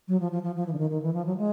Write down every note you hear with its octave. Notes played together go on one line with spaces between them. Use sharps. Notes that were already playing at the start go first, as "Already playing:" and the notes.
F#3
F3
F3
F3
F3
E3
D3
D#3
D#3
E3
F3
F#3
G#3